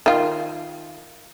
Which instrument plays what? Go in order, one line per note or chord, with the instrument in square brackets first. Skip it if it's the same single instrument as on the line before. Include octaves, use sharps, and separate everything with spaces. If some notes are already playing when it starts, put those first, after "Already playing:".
[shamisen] D#3 F4